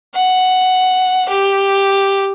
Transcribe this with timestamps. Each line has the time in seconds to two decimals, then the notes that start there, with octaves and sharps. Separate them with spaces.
0.15 F#5
1.29 G4